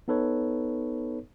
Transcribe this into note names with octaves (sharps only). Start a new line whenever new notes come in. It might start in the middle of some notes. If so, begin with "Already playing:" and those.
B3 D#4 A4 B4 C#5